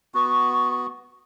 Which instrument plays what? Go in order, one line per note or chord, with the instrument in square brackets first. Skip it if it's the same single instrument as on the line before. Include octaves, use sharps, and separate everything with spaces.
[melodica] B3 F#4 [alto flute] C#6